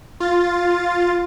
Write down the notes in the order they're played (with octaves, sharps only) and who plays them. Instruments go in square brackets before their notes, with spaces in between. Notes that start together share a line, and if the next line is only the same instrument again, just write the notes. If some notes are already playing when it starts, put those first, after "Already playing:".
[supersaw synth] F4 A6